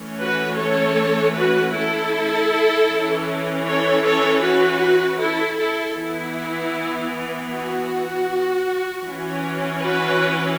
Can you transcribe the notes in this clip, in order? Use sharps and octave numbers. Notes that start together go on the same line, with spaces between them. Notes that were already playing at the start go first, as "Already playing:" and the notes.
Already playing: E3 A3 C#4
F#4 B4
A4 C#5
F#4 B4
E4 A4
E3 C#4
A4 C#5
A4 C#5
F#4 B4
E4 A4
E4 A4
E3 B3 E4
F#4
E3 C#4
F#4 B4